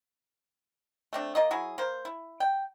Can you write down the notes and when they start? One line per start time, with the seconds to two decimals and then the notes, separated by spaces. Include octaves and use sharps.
1.13 A3 C4 D4
1.35 A#3 F4 D#5
1.51 F#3 E4 G#4
1.78 A#3 C5
2.05 E4
2.40 G5